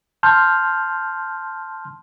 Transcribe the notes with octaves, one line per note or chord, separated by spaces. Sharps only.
A5 C6 F6 G6